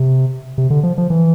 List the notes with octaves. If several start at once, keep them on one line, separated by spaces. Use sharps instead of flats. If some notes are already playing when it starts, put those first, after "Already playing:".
Already playing: C3
C3
D3
F3
F3
E3